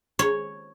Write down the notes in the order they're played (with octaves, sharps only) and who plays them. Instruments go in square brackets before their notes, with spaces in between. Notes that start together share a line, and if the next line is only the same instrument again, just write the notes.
[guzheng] C#5